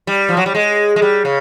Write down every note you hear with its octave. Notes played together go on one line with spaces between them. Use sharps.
G3
F3
F#3
G3
G#3
G#3
G3
C#3